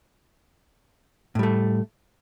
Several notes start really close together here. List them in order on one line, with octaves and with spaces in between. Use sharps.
A2 G3 A3